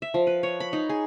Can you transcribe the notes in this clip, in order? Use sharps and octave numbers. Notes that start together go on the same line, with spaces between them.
E5
F3
B4
C#5
B5
D#4
G#4